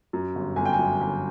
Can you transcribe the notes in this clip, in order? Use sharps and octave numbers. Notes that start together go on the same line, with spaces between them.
F#2
G1
G1 G#5
G5
G#5
F#2
G1